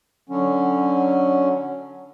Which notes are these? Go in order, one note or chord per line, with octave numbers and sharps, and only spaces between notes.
D3 F#3 C#4